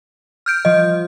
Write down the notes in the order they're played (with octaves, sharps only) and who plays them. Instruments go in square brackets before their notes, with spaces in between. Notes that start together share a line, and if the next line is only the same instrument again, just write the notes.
[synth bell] F6 G6 D7
[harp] F3 [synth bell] D#5